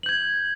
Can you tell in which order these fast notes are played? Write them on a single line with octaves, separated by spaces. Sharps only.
F#7 G6 G#6